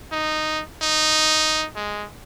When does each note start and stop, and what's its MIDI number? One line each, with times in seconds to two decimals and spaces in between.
0.12 0.63 63
0.82 1.66 63
1.76 2.05 56